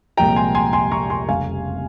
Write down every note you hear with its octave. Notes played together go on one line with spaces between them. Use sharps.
C2 A#2 F3 G#3 G5 A#5
G#5 C6
G#5 C6
G#5 C6
A#5 C#6
G#5 C6
F1 F2 C#3 G3 F5 G#5